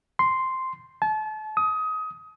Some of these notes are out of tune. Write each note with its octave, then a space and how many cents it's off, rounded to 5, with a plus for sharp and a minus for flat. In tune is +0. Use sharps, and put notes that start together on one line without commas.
C6 +0
A5 -35
D#6 +25